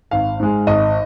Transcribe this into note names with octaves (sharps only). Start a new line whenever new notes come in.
G#1 F5
G#2 G#3
G#1 D#5